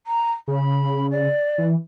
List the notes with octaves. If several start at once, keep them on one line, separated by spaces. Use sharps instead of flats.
A#5
C#3 B5
D5
E3